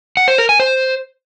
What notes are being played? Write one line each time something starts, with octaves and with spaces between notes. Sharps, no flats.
F#5
C5
A#4
G#5
C5